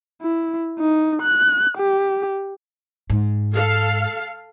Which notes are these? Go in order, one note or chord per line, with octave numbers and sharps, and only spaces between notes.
E4
D#4
F#6
G4
G#2
A4 F5